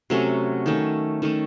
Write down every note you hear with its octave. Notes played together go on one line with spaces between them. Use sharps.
C3 F#3 A3 C#4
D#3 A3 C#4
D#3 A3 C#4